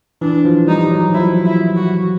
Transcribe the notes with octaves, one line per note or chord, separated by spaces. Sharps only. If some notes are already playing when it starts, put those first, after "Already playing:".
E3 D4
F3
G3 D#4
F#3
F3 E4
E4
F#4